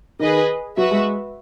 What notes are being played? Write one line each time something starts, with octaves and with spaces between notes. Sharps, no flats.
D#3 G#4 B4 D#5
F#3 F#4 B4 E5
G#3